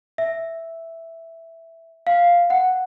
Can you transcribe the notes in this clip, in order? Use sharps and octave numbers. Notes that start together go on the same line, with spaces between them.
E5
F5
F#5